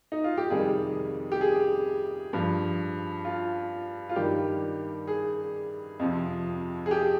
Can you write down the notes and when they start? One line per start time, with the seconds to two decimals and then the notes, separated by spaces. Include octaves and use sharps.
0.12 D#4
0.24 F4
0.37 G4
0.50 F2 C3 D#3 G3 G#4
1.32 G4
1.41 G#4
2.33 G2 F3
3.25 F4
4.09 F4
4.16 G2 D#3 G3 G4
5.07 G#4
5.99 F2 C3 F3
6.86 G#4
6.91 G4